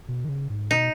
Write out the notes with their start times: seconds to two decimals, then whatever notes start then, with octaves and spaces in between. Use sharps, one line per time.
0.08 B2
0.25 D#3
0.29 C#3
0.50 G#2
0.71 B2 D#4